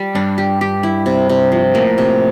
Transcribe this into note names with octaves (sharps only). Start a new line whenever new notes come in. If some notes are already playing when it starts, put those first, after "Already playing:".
Already playing: G3
G2 D4
G4
G4
E4
C3
C3
F3
A2 A#3
C3